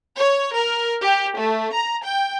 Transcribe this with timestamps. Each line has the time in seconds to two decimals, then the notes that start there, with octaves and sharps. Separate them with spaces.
0.17 C#5
0.54 A#4
1.01 G4
1.37 A3
1.74 A#5
2.04 G5